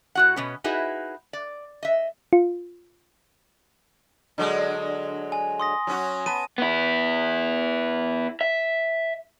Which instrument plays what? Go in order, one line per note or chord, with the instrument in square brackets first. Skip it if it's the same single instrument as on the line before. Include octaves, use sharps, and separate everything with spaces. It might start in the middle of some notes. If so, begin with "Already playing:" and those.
[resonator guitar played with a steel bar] A2 F#4 F#5
B2 B3 C#4
D#4 E4 F#4 G#4 B4
D5
D#5 E5
[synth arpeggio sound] F4
[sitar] D3 F#3 G#3
[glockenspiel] G#5
C6 D#6 A#6
[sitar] F#3 C#4 F#4
[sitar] B3 [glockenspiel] A5 D#7
[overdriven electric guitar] B3 E4
E5